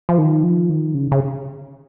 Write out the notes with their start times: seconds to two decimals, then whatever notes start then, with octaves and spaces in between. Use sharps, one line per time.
0.09 F3
0.18 D#3
0.44 F3
0.70 D#3
0.94 C#3
1.12 C#3